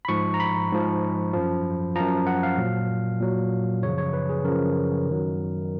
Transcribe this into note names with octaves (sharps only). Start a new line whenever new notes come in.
B5
G#2 F3 C#6
A#5
B5
G#2 F3
F#2 F3
F#2 F3 A#5
F#5
F5
A#2 F#3
A#2 F#3
F#2 C#3 F3 C#5
C#5
B4
G#4
F#2 C#3 F3 A#4
F#2 D#3 F#3